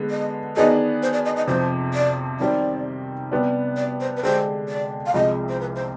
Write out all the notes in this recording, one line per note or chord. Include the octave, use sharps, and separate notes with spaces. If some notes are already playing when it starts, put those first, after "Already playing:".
Already playing: D3 G#3 B3
D#5
D#3 B3 D4 G#4 D#5
C5
D5
D#5
D#5
F2 C3 F3 C5
D5
D#3 G3 C4 G4 D5
C3 G3 B3 D4 G4
D5
C5
B4
D3 G#3 D4 G4 C5
D5
F5
C2 C3 F3 G#3 D#5
C5
B4
C5